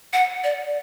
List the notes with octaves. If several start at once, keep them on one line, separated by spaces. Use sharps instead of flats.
F#5
D5